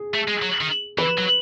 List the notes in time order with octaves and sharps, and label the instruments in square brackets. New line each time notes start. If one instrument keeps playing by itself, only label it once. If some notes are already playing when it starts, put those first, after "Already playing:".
Already playing: [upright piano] G#4
[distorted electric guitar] A3
G#3
F#3
D#3
[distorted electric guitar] E3 [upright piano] B4
[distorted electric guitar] F#3